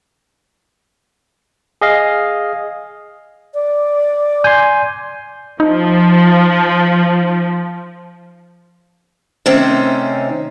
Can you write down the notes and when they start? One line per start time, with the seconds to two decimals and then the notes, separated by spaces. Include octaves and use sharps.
1.81 G#4 D#5 F5
3.54 D5
4.44 G#5 C6 G6
5.60 F3 D#4
9.46 C3 D#3 A3 C4 C#4